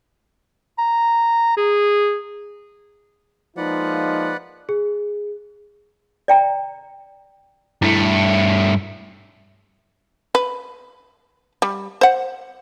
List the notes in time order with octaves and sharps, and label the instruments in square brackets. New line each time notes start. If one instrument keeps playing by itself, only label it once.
[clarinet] A#5
G#4
[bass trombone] F3 [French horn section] G#3 A#3 D#4 [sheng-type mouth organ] B4 D5 F#5
[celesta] G#4
[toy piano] D5 G5 A#5
[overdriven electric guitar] G2 A3 [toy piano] E4
[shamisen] B4
G3
C5 F#5